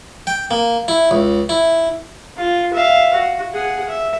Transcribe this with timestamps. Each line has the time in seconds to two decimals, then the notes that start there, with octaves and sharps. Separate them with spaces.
0.27 G5
0.51 A#3
0.88 E4
1.11 C#2
1.49 E4
2.37 F4
2.74 E5 F5
3.14 F#4
3.54 G#4 F#5
3.89 E5